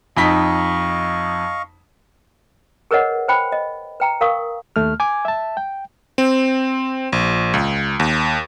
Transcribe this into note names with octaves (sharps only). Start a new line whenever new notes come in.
F2 D#4 D#5 F5 C#6 B6
G#4 A#4 B4 C#5 D#5 F#5
B4 C5 G5 B5
D#5
B4 G5 A#5
A#4 F5 C#6 D#6
D#2 A3 F6
G#5 D6 G#6
E5 A5
G5
C4
A#1
C#2
D#2